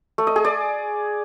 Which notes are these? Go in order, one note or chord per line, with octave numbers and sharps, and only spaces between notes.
A3
D#5
G#4
D5